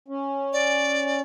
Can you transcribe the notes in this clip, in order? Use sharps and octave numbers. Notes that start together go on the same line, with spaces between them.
C#4
D5